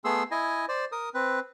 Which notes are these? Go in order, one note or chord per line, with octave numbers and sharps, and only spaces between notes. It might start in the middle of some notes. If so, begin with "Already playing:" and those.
A3 B3 G#4 C6 E6
E4 D#5 G#5
C5 D5
A#4 D#6
C4 B4